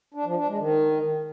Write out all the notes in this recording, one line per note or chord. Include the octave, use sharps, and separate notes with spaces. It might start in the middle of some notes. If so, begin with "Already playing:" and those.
D4
F3
D4
G#3
D#3